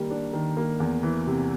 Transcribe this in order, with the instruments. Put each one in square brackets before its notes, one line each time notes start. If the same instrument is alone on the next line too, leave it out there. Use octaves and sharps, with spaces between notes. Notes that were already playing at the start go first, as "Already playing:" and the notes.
Already playing: [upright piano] D#3 G3 A#3
D4
D#3
A#3
E2
E3
C3